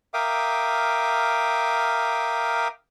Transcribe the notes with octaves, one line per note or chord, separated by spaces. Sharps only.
A#4 E5 F5 G5 D6 D#6